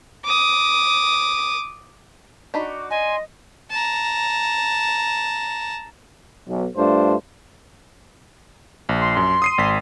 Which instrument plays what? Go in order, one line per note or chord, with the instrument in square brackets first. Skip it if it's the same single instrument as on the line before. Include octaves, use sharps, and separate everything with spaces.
[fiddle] D6 D#6
[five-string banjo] D4 D#4 B5 [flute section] F#4 D6
[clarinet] D#5 [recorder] G#5 [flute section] C6
[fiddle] A5 A#5
[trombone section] B1
G2 A3 D4 F4 C5
[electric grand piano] A#1
[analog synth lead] C6
[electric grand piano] F#2
D#6 C7 D#7
G#1 B6